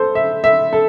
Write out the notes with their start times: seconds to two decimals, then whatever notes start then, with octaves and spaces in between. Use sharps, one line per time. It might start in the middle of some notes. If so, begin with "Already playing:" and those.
Already playing: A4 C5
0.15 E5
0.44 E5
0.73 A4